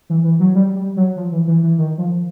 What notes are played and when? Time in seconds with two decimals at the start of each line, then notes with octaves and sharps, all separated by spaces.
0.10 E3
0.24 E3
0.40 F#3
0.55 G3
0.75 G3
0.97 F#3
1.16 F3
1.32 E3
1.47 E3
1.63 E3
1.78 D#3
1.98 F3